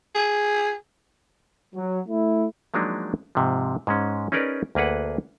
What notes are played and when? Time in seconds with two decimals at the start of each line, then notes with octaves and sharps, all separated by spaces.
0.15 G#4
1.75 F#3
2.08 A3 E4
2.74 F3 F#3 G#3 A#3 D4 D#4
3.35 G#2 C3 F3
3.87 G#2 G#3 C#4
4.32 C#4 D#4 G#4 A#4 B4 D5
4.75 D2 A#3 G#4 B4 F#5